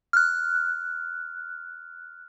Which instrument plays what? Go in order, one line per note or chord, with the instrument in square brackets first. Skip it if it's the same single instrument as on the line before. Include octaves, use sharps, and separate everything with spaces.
[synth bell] F6 F#6